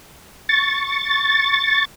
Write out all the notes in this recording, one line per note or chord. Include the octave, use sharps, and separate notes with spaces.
C#6 A6